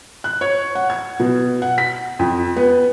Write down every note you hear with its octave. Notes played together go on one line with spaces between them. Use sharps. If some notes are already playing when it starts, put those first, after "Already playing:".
F#6
C#5
F#5
G#6
B2
F#5
B6
F2
B3